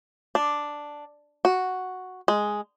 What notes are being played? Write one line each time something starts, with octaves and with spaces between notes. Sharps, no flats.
D4
F#4
G#3